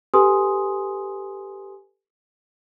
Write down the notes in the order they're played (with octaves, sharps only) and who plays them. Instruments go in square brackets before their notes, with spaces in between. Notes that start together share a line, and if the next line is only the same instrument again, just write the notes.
[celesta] G4 A4 B4 G#5 C6 D#6